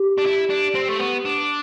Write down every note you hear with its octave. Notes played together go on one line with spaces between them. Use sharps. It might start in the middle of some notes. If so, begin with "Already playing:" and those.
Already playing: G4
D4
E4
D4
C4
A3
B3
D4